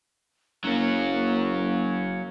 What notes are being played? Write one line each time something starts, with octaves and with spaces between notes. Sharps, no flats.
F#1 F#3 A#3 C#4